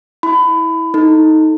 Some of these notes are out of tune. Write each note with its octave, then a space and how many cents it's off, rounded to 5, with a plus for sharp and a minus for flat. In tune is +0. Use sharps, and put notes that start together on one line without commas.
E4 -20 B5 +25
D#4 +15 A4 +0